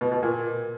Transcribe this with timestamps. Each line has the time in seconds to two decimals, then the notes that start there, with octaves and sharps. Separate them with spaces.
0.01 B2
0.12 B2
0.23 A#2